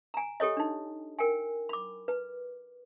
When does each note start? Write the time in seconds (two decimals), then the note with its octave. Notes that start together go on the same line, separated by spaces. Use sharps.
0.14 G#5 A#5
0.40 G4 A4 C#5 D#5
0.57 D4 D#4
1.19 A#4 G5 G#5
1.69 B5 D6
2.08 B4